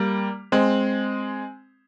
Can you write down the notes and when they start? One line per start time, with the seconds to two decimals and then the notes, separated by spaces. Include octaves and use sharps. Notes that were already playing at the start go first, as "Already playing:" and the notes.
Already playing: G3 A#3
0.52 G#3 C4